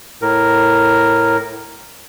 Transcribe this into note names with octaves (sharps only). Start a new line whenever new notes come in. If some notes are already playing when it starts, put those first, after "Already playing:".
A2 A#4